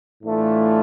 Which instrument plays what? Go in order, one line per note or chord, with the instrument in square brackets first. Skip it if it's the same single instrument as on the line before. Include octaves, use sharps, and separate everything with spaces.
[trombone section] A2 E3 A3 D4 F4